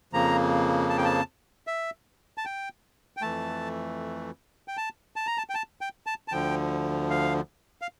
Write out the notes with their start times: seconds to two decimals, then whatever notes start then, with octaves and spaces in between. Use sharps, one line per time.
0.13 F2 C#3 F3 A#3 A#5
0.90 A5
0.98 G5
1.05 A5
1.67 E5
2.38 A5
2.46 G5
3.17 G5
3.22 F2 E3 A3 A5
4.68 G5
4.77 A5
5.16 A5
5.27 A#5
5.38 A5
5.50 G5
5.55 A5
5.81 G5
6.07 A5
6.28 A5
6.32 D2 D3 F3 G5
7.10 F5
7.82 F5